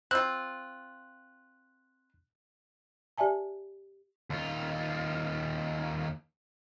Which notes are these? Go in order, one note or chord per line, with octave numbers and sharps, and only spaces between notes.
C4 F4 F#6
G4 D5 E5 G#5 A5
D#2 F4